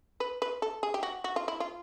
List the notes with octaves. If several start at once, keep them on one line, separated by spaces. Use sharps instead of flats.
B4
B4
A4
G#4
G4
F#4
F#4
F4
E4
F4